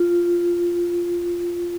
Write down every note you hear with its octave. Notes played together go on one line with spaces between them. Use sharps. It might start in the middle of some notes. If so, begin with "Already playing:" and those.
Already playing: F4